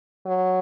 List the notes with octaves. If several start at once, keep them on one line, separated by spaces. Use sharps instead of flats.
F#3